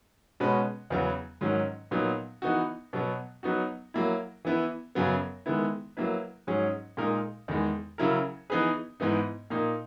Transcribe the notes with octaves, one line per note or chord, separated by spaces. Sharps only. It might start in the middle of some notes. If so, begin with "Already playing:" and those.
B2 G#3 C#4 F#4 B4
E2 C#3 F#3 B3
G#2 D#3 F#3 C#4
A#2 F#3 B3 D#4
E3 B3 D#4 F#4
B2 F#3 B3
F#3 B3 D#4 F#4
F#3 A#3 E4
E3 B3 E4
F#2 C#3 F#3 B3
D#3 G#3 B3 E4
F#3 A#3 E4 B4
G#2 F#3 C#4 G#4
A#2 G#3 D#4 A#4
E2 D#3 G#3
C#3 F#3 C#4 E4 A#4
E3 B3 D#4 G#4 B4
G#2 E3 B3 D#4
A#2 A#3 D#4